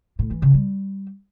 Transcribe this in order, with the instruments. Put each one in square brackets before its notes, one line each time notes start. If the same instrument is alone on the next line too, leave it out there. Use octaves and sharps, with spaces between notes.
[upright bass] A2
E3
C#3
G3